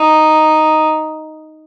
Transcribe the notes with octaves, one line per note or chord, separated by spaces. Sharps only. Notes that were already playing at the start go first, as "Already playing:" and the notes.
Already playing: D#4